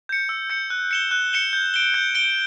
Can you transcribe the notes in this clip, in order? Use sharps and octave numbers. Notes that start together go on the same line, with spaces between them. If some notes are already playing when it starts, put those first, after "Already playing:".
G6 C#7
E6
G6 C#7
F#6
C#7 E7 G7
F#6
C#7 E7 G7
G6
D7 G7
G6
D7 G7